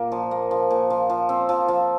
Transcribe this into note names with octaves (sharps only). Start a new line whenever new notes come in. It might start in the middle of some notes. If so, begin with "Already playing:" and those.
Already playing: A#2 A#3
F3
A#3
F3
A#2
F3
F3
C4
F3
F3